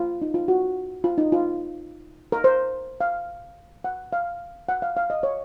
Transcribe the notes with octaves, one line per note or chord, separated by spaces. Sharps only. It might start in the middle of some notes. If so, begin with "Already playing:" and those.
Already playing: F4
D#4
F4
F#4
F4
D#4
F4
A#4
C5
F5
F#5
F5
F#5
F5
F5
D#5
C#5